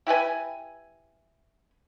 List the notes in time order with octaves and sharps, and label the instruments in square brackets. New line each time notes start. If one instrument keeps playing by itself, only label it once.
[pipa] E4 G4 B4 G#5